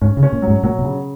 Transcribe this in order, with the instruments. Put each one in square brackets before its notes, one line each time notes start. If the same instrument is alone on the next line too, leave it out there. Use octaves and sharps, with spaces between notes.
[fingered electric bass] G#2 [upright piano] C#4
[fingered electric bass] C#3
[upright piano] C#4
[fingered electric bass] A#2
[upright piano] F#3
[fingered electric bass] G#2
[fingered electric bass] A#2 [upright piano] F#3
[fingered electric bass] B2
[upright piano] C#3